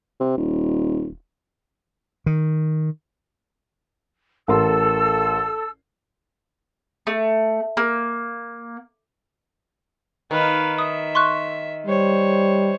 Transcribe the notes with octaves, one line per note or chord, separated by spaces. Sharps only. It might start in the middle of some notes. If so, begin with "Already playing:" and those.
C3
D#1
D#3
A1 A4 A#4 C6 E6
A3
A#3
D#3 B4 F5
E5 D#6
C6 C#6 F#6
G3 C5 C#5